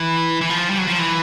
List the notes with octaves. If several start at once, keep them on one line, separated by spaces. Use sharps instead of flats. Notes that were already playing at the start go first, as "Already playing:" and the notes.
Already playing: E3
E3
F3
G3
F#3
F3
E3